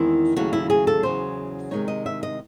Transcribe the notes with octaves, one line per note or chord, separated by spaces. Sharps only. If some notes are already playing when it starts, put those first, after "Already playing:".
Already playing: E2 D#3 G#3 C4 E4
D#2 C#3 F#3 A3 F#4
E4
G#4
A4
E2 C#3 F#3 C5
C3 D#3 G#3 D#4 C#5
D#5
E5
D#5